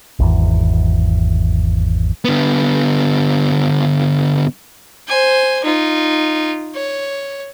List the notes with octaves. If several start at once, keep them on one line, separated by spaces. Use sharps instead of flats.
G#1 E2
D3 B3
C5 G#5
D#4 F4
C#5